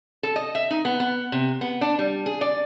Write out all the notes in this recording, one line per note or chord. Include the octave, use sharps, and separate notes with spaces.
A4
D#5
E5
D#4
B3
B3
C3
B3
D4
G3
G#4
D5